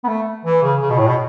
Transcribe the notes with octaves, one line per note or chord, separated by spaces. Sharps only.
B3
A3
E3
C#3
C#3
B2
A2
B2